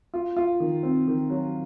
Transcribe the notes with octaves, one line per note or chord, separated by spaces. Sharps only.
F4
F4
D#3
C4
D#3
F#3